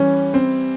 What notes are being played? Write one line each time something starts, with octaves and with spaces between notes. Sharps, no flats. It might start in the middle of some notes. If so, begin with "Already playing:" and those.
Already playing: E3 G3 C#4
C4